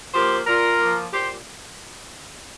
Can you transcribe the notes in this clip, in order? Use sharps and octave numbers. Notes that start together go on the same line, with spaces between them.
F3 A#3 G4 C5
A#2 F4 A#4
F3 A#3
A#2 G4 C5